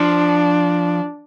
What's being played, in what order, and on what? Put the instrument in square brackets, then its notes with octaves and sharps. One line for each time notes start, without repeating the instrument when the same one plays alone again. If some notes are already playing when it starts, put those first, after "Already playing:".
Already playing: [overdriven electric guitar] F3 [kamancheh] D4